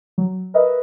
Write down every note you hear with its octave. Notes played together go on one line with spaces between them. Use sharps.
F#3
A#4 B4 D#5 E5